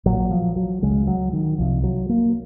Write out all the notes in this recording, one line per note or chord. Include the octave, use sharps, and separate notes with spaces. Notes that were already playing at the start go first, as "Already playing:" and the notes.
A#1 A#2 F#3
F3
F#3
C#2 C#3 G#3
F#3
D#3
C2 C3 F3
F#3
A#3